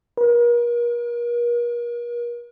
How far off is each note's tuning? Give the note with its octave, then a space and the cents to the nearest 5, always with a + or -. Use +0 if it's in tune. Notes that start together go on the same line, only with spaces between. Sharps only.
A#4 +40